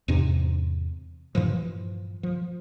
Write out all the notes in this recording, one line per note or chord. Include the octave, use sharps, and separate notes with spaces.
E2 G#2 C3 D4
G2 A#2 E3 F3
F3